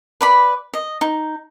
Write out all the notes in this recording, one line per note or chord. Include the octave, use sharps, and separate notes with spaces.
B4 D5 B5
D#5
D#4